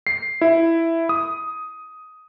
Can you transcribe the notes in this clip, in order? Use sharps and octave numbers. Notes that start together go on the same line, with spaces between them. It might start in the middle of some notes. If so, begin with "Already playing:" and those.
C7
E4
D#6